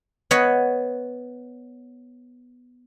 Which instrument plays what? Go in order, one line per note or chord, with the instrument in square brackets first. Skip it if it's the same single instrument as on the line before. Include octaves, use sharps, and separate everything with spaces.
[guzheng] B3 C#5 D#5 F#5